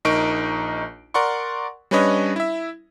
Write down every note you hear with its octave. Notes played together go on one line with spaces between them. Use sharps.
A#1 D#4 A#4 C#6 D7
A#4 D5 F#5 C6 C#6
G3 C#4 D4 B4 C#5 D#5
E4 E5